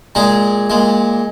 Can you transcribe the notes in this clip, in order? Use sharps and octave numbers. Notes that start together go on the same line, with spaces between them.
A#2 G#3 G#4
A#2 G#3